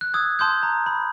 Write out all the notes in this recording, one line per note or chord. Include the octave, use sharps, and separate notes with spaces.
F#6
D#6 E6 G#6
A5 C6 D#6 G6
A#5
B5